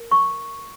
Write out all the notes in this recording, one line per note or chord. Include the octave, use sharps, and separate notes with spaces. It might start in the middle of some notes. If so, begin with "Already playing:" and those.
Already playing: A#4
C#6